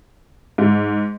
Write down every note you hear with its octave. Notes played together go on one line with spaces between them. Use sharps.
G#2